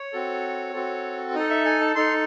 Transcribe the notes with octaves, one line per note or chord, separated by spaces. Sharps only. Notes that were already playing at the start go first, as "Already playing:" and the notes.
Already playing: C#5
C4 F#4 A4
C4 F#4 A4
D#4 A4 D#5
E5
G#5
A5
D#4 A4 C6